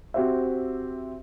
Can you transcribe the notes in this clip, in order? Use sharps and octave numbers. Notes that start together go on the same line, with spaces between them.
C4 F#4 G4 C5 E5